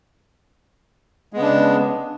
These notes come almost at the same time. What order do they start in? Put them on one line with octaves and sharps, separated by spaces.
G#3 B3 C#3 D4